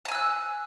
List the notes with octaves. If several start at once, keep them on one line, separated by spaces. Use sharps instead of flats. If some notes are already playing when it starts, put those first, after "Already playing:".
G#5 A5 E6 F#6